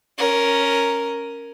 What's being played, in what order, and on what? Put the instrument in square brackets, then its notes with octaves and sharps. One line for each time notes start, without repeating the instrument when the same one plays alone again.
[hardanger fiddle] C#4 A#4